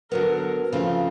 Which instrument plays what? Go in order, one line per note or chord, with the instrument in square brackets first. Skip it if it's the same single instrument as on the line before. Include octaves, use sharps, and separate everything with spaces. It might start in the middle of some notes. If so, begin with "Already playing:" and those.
[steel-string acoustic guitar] D3 F#3 B3 [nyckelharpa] A#4
[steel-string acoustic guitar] C#3 F3 A3 C4 F4